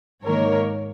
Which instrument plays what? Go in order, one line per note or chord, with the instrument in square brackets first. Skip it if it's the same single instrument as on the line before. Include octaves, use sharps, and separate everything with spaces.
[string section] G#2 D#3 A#3 A#4 C#5